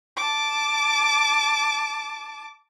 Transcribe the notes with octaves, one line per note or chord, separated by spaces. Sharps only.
A5 D6